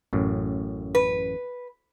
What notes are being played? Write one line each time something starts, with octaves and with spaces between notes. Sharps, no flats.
A1 F#2 A2
B4